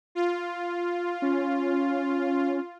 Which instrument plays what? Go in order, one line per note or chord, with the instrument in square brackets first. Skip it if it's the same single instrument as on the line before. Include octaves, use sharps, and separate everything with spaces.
[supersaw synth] F4
[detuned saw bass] C#4